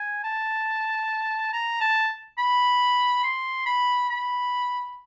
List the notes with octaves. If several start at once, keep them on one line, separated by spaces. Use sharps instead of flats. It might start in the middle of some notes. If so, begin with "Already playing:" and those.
Already playing: G#5
A5
A#5
A5
B5
C6
B5
B5